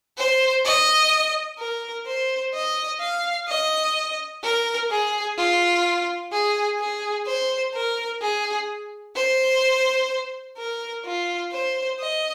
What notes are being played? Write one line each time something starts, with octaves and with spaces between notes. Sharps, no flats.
C5
D#5
A#4
C5
D#5
F5
D#5
A#4
G#4
F4
G#4
G#4
C5
A#4
G#4
C5
A#4
F4
C5
D#5